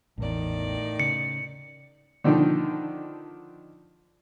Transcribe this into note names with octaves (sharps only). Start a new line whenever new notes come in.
A1 E2 A2 D#3 D5
C#3 C#7
D3 D#3 F3 D4 D#4